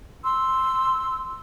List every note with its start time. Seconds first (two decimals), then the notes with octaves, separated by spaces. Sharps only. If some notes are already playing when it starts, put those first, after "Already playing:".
0.24 C6 E6